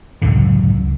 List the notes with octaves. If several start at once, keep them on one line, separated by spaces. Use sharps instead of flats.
C#2 F#2 A2 D3